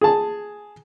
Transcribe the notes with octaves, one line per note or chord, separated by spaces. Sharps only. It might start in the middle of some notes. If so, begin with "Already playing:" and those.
G#4 A5